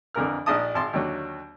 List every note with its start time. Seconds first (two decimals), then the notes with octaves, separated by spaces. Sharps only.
0.14 F2 D3 E3 A#4 F6
0.46 A#1 D4 D#4 D#5 A5 D#6
0.74 G#1 A5 C6
0.93 D#2 D3 F#3